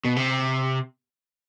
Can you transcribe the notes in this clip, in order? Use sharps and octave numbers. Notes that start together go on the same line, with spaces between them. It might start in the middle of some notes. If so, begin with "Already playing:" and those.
B2
C3